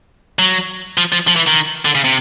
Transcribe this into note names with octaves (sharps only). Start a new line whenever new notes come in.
F#3
F3
F3
F3
E3
D#3
D3
C#3
C3